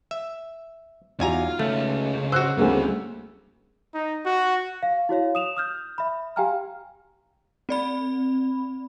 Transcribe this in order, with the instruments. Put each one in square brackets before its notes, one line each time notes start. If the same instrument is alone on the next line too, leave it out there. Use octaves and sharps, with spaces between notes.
[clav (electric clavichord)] E5
[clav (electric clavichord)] E2 G#5 A#5 [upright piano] D#4 F#4 [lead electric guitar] F4
[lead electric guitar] C#2 C#4 [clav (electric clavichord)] A3
[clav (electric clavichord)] F#4 C5 [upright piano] E6 F#6
[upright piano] D2 C#3 A#3 [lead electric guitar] G3 C4
[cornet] D#4
F#4
[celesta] F5
E4 F#4 C#5 F5
D#6 E7 F7
D#6 F6 G6
E5 B5
G4 F5 G5 G#5 A#5 F6
[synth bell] C4 D5 B5